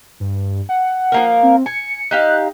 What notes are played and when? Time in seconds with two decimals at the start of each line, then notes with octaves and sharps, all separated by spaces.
0.20 G2
0.69 F#5
1.12 F3 A#3 A#4
1.43 C4
1.66 G#5 C#7
2.11 D#4 G4 F5 F#6